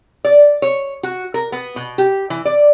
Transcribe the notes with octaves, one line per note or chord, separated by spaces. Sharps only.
D5
C#5
F#4
A#4
B3
B2
G4
E3
D5